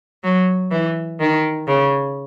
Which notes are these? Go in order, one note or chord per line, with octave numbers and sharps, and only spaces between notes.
F#3
E3
D#3
C#3